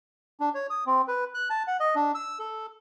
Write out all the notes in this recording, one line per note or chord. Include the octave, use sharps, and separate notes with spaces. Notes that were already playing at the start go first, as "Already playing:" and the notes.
D4
C#5
D#6
C4
B4
F#6
A5
F#5
D#5
D4
E6
A4